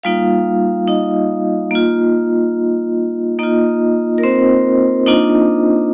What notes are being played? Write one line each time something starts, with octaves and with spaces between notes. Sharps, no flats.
G3 A#3 D#4 F4 F5
D#4 D#5
A#3 F4
A#3 D#4 F4 D#5
A#4
C4 C5
A#3 D4 D#4 F4 D#5